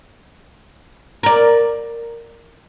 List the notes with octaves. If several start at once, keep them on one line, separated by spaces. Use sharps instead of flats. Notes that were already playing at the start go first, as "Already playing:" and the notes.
A#4 D5